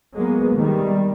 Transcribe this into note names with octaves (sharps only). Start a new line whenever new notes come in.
F#3 G#3 A#3 B3
D#3 G3